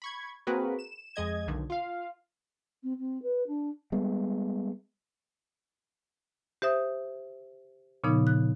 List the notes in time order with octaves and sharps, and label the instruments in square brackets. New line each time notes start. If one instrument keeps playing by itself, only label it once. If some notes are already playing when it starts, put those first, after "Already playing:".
[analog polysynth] B5 C#6 G#6
A#3 C4 F#4 G#4 A#4 B4
E7
F2 G#3 D#5 G#6
B1 D3 D#3
F4 F5
[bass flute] C4
C4
B4
D4
[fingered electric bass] G3 G#3 B3
[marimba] G4 C5 E5 D#6
A#2 C#3 F3 B3 D#4
F#6